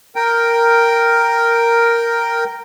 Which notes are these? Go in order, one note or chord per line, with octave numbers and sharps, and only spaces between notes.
A#4 G5